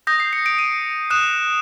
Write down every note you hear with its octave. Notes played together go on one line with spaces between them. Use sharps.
D#6 G6 A#6
C7
C#7
D7
D#7
D#6 F#6 E7